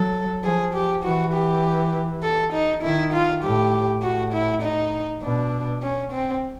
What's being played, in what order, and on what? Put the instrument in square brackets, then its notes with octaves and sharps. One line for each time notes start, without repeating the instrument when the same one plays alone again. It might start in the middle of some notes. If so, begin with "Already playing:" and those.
Already playing: [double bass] F#3 [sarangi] A4
[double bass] F3 [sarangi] G#4
[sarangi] G4
[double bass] E3 [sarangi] F#4
[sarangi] G4
A4
D#4
[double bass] D#3 [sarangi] E4
[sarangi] F4
[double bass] A2 [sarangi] G4
[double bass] A2 [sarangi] F#4
[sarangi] E4
D#4
[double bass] B2 [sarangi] D4
[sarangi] C#4
C4